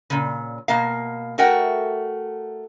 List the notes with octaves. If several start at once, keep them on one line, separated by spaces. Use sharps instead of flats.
A#2 C#3
B2 A#3 F5
A3 F#4 A#4 F#5 G5